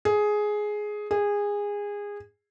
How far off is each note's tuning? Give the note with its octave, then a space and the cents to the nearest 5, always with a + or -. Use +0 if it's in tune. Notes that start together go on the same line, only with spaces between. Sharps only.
G#4 +10
G#4 -20